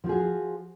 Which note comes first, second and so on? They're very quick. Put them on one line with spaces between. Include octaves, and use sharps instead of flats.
F3 F4 G#4 F#4